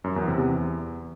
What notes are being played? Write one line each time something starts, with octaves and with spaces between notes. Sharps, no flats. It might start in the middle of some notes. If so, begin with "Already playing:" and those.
F#2
E2
C3
E2